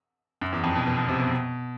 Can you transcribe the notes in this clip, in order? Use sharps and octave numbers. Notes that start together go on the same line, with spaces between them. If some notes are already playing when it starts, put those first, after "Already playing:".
F#2
E2
F2
B2
B2
B2
C3
B2